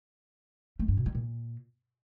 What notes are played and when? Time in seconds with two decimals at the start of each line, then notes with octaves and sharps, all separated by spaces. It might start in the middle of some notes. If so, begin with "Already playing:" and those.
0.79 A3
0.88 G2
0.97 B2
1.06 G3
1.15 A#2